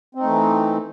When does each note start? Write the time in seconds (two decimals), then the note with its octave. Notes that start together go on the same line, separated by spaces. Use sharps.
0.15 C4
0.19 D#4
0.23 A3
0.27 E3